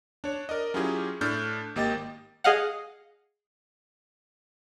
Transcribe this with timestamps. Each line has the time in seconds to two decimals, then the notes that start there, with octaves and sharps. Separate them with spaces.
0.24 D4 C#5
0.49 A#4 D5 D#5
0.74 F#3 C#4 E4 F4 G4 G#4
1.21 A2 D4 A4 F6 G6
1.76 G#1 A#3 G4 D#5 G5 A6
2.44 G#4 D#5 F5 F#5